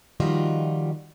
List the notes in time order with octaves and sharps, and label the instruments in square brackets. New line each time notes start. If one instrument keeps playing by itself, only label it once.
[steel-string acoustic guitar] D#3 F3 G3 F4 F#4 D#5